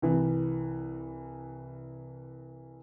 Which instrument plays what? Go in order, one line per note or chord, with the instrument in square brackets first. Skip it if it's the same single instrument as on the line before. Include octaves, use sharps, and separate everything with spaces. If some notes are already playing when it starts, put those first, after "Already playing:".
[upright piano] C2 E3